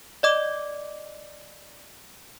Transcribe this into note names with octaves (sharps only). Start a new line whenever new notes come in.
D5 D#5 D6